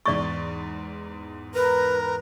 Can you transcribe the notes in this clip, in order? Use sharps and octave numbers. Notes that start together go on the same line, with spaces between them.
E2 G#2 D5 C#6 A6
A#4 B4 A#5